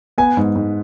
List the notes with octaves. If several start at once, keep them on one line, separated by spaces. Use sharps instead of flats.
B3 G#5
G#2
G#2